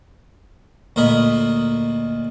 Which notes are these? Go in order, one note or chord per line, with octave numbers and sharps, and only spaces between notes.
D2 A#2 A#4 D#5 B5